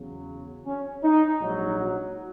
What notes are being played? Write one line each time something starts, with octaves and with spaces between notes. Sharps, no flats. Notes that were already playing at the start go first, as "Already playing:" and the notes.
Already playing: E2 C#3 F#3
C#4
D#4
A#1 G#2 F#3
F#4